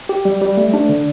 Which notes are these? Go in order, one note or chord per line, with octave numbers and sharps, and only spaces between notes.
G4
G3
G3
A3
D4
D3